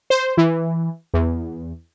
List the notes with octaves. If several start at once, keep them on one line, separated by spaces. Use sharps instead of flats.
C5
E3
E2